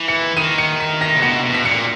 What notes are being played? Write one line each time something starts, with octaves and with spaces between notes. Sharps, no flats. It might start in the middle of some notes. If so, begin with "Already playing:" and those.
Already playing: E3
C#7
D#3 D#7
C#7
B6
A#6
C#3
B2 C#7
B2
B6
A#2 C#7